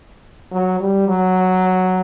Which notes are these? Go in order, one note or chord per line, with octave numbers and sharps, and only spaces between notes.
F#3
G3
F#3